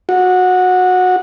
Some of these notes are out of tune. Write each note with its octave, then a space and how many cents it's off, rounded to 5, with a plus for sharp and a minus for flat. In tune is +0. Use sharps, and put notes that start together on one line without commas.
F#4 -15